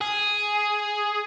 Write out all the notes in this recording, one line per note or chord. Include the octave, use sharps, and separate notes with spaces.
G#4